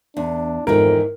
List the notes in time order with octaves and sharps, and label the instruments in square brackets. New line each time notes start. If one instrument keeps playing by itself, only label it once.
[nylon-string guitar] E2 [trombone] D4
[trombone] F2 [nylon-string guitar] G#2 D#3 E3 [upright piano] A#4